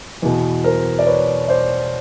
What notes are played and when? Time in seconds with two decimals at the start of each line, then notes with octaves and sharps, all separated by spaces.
0.22 E2 B2
0.64 A#4 C5
0.99 D5
1.07 B4 C#5
1.48 C5 D5